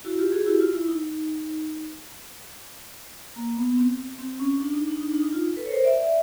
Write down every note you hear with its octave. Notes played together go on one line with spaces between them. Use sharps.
E4 F#4
F4 G4
F#4 G#4
G4
E4 F#4
F4
E4
D#4
A#3
B3
C4
C4
C#4
D4
D#4
D4
D#4
D4
D#4
F4
A4 B4
C#5
A#4 C5
D5 E5